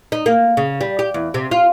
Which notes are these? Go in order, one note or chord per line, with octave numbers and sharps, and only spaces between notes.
D#4
A#3
C#3
G3
G4
E2
C3
F4